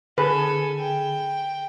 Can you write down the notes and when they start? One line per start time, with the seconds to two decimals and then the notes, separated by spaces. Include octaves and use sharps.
0.18 D3 G#4 A4 B4 G#5
0.79 G5